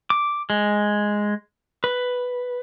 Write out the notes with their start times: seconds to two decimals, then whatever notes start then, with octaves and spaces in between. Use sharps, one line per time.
0.10 D6
0.50 G#3
1.84 B4